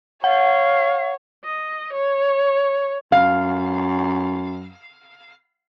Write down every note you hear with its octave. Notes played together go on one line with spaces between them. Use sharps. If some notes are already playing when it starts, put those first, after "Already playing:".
C#5 F5 F#5
D#5
C#5
F#2 F5